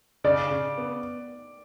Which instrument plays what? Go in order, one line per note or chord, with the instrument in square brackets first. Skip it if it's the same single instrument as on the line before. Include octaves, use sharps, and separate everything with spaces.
[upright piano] C#3 [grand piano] D5
[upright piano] C#3
B3